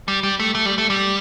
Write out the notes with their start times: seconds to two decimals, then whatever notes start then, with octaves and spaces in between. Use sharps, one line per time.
0.08 G3
0.23 G3
0.39 A3
0.55 A3
0.66 G3
0.78 A3
0.90 G3